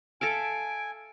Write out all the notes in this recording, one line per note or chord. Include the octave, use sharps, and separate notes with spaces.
A4 E5 F5 G#5 D7